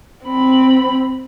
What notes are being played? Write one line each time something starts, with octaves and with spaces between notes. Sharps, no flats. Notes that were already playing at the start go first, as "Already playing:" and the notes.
C4 B5